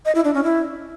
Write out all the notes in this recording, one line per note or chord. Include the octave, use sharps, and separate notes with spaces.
D#5
E4
D4
C#4
E4